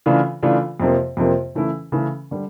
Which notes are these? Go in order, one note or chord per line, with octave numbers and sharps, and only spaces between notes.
C#3 E3 A3 D4 F4
C#3 E3 A3 D4 F4
F2 C3 F3 A#3
F2 C3 F3 A#3
C#3 E3 A3 C#4 E4
C#3 E3 A3 C#4 E4
D3 G3